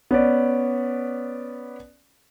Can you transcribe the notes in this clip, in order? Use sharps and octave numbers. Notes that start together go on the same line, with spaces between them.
B3 C#4 D5